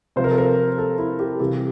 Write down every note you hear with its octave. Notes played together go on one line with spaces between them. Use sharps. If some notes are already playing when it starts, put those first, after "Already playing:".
C3 F3 C5
A#4
A4
A#4
A4
E4
G4
C3 E3 G3 G4